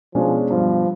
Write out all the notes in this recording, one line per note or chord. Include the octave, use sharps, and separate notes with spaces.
B2 F3 G#3 C#4 D4
G2 F3